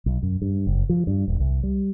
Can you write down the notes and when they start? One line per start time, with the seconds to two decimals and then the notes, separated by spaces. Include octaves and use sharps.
0.06 B1
0.23 F#2
0.42 G2
0.67 F#1
0.89 F3
1.07 G2
1.28 D#1
1.40 C2
1.63 G3